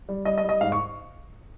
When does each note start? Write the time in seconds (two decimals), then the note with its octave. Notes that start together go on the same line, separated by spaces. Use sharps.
0.09 G3
0.25 G3 D#5
0.38 D#5
0.44 G3
0.49 D#5
0.61 G#2 F5
0.72 C#6